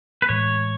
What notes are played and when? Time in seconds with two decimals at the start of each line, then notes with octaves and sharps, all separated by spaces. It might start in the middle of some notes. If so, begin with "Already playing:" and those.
0.22 B4
0.29 A2 E3 G#3 C#5